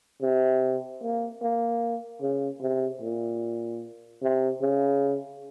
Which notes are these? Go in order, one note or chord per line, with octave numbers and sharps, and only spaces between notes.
C3
A#3
A#3
C#3
C3
A#2
C3
C#3